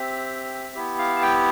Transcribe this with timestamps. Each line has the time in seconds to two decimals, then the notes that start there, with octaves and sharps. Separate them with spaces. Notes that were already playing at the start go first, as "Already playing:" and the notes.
Already playing: C4 G4 E5
0.75 B3 E4 G4
0.98 F5
1.16 A5
1.22 G5